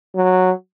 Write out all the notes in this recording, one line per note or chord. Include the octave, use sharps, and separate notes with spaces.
F#3